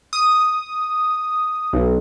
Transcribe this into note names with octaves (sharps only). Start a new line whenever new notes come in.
D#6
B1